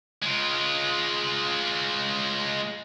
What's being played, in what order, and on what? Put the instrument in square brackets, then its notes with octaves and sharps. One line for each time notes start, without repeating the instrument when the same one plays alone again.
[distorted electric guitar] G#3 F4